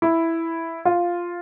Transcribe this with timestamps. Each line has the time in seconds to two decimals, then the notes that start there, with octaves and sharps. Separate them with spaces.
0.02 E4
0.85 F4